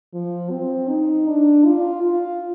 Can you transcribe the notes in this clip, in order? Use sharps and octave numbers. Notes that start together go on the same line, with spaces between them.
F3
C4
D#4
D4
F4
F4